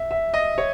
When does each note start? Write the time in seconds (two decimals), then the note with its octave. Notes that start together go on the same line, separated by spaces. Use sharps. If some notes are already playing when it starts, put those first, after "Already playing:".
Already playing: E5
0.11 E5
0.34 D#5
0.58 C#5